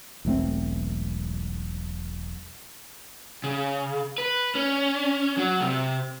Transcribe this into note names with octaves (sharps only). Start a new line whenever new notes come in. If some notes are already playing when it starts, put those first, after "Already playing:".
E1 B1 A3 C4
C#3
B4
C#4
F#3
C3